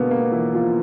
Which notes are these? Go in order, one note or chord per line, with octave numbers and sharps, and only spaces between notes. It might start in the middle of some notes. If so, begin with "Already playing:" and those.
Already playing: B2 D3 G#3 A#3 B3
A#3
E3 F3 E4
F3 F4